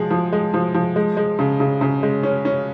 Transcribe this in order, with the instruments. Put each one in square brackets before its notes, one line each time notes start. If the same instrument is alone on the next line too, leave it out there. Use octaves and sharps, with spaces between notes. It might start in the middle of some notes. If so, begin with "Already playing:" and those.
Already playing: [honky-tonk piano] F3 G#3 G#4
F3
G#3
F3
F3
G#3
G#3
C#3
C#3
C#3
G#3
C#4
C#4